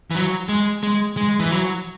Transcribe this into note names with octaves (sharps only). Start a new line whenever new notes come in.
E3
F#3
G#3
G#3
G#3
E3
F#3